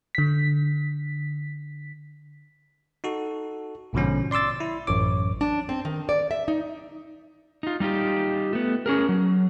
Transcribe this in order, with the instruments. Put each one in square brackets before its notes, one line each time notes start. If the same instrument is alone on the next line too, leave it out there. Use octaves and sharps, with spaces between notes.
[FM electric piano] D3 B6
[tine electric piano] D#4 F#4 A4
A#1 G#2 B2 D3 F3 C#4
D5 C6 D6 E6 A6
E4
A1 F#2 C#5 D6
[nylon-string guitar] D4
C4
D#3
D5
E5
D#4
[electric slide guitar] D#4 F4
G3 D#4 F4 G4
A3 B3
C#4 G#4 A#4
F#3